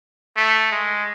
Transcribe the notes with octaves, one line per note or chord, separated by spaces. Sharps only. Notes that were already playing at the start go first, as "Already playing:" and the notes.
A3
G#3